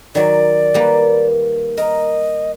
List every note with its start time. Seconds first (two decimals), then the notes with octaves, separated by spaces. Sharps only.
0.15 D#3 F#3 D5
0.74 G3 A#3 B4
1.77 A#4 D#5